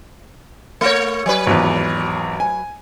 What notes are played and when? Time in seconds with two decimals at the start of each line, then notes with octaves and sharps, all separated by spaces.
0.81 A3 A#4 C#5
1.26 F#3 B4
1.46 G#1 E2
2.40 G#5